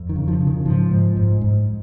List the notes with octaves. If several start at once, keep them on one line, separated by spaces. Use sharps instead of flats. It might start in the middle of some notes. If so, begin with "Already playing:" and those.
Already playing: F2
D#3
C#3
F3
C#3
D#3
G#2 F3
G#2
G#2
G#2